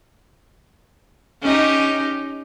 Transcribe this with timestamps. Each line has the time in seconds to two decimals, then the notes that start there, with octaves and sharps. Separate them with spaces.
1.42 C#4 D#4 G4